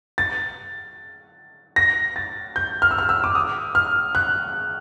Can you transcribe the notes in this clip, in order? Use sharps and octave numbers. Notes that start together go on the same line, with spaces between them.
A6
A#6
A6
G6
F6
E6
F6
E6
D6
D#6
F6
F#6